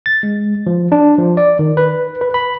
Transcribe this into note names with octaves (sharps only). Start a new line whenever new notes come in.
A6
G#3
F3
D4
F3
D5
D#3
B4
B4
B5